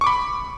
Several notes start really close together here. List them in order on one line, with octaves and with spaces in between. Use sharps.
C#6 D6 B5